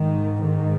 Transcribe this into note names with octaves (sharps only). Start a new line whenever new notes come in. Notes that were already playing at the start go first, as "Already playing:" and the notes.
Already playing: G#2 D#3
D#3